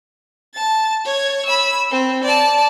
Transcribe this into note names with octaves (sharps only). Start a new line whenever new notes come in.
A5 A6
C#5 G#6
B5 E6
C4
D5 A5